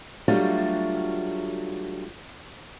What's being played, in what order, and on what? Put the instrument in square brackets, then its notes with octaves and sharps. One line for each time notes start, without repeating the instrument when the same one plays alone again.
[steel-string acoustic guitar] F#3 G3 A3 D4 F4 F#4